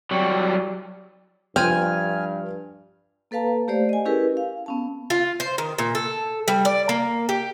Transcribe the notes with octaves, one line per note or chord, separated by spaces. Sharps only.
F#3 G3
G2 F3 C4 F4 G#5 F6
A#3 A4 B4 F5 A5 A#5
A3 G4 C5 D5 F5
D#5 G#5
C#4 E4 G4 G#4 A#4 B4
F5
B3 C#4 A5
F4
C5
D#3
A#2
A4
G3
D5
A#3
G4